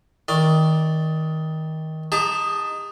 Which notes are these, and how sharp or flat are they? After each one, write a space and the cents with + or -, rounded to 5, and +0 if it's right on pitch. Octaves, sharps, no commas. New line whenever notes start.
D#3 +20 D5 +0
D#4 +0 G4 +45 A5 +0